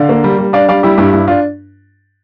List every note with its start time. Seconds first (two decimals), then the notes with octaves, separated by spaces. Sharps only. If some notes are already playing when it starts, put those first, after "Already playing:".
Already playing: D3 D5 F5
0.09 A#3
0.24 G3
0.38 G3
0.53 D4 D5 F5
0.69 G3 D5 F5
0.83 G3 E4 G4
0.98 G2 E4 G4
1.13 G2 E4
1.28 D4 F4